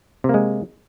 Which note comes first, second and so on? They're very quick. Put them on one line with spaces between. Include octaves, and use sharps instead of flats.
C3 A#3 G#3